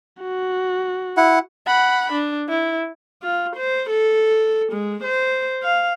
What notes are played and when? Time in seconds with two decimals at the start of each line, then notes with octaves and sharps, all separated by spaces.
0.21 F#4
1.17 E4 F#5
1.67 F#5 B5
2.12 D4
2.49 E4
3.23 F4
3.56 C5
3.89 A4
4.72 G#3
5.03 C5
5.63 F5